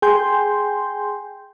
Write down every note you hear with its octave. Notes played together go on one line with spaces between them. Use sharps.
G#4 G5 G#5 C6 G6